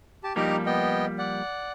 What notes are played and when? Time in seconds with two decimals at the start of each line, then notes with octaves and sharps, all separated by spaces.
0.24 G4 A5
0.36 F3 G3 A#3 D#4 G4 A#5
0.66 B3 D#5 G5
1.18 D5 F#5